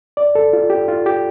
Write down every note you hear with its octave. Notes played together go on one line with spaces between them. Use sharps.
D5
A4
F4
G4
F4
G4